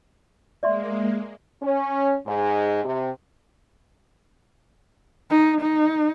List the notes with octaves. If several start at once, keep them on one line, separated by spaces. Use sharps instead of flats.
G#3 A#3 D5 E5 C6
C#4
G#2
C3
D#4
D#4